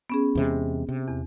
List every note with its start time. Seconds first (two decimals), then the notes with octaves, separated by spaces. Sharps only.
0.10 B3 C#4 G#4
0.35 E2 C3 G#3
0.89 C3
1.08 E2